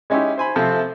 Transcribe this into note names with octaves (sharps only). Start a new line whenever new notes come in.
G#3 C#4 D#4 E4 G4
C5 G#5 B5
C3 F3 A3 C4